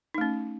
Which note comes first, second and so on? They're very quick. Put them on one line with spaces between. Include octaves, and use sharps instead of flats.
D#4 A3 C#4